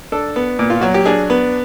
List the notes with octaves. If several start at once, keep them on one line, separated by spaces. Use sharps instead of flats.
D4 A4
B3
A#2
F4
F#3 F#4
G4
D4 G#4
B3